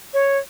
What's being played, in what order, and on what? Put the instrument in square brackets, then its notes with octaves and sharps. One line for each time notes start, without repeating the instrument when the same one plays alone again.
[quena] C#5